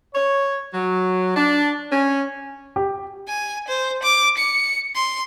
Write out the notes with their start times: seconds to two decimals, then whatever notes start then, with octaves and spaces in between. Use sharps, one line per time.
0.15 C#5
0.74 F#3
1.36 D4
1.91 C#4
2.76 G4
3.28 G#5
3.68 C5
4.03 D6
4.38 C#7
4.95 C6